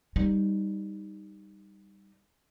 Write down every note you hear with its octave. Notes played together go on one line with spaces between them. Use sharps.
G3 D#4